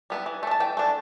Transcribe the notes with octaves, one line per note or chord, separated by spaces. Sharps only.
G3 B3 E4
E3
A3 D4
A5
E3 G5
A3 D4